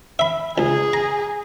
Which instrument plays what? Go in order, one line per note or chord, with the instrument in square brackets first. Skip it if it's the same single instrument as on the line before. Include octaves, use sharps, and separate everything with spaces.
[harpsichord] E5 B5
[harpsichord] C#2 [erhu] G#4
[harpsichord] A#5